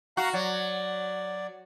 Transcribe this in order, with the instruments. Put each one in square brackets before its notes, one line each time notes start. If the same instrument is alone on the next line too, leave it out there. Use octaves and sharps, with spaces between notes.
[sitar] F#4 [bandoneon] F5 A#5
[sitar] F#3 [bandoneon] D5